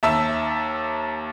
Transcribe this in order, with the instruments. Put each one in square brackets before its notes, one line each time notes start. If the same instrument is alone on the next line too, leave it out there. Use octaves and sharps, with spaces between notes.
[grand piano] D#2 E5 A5 E6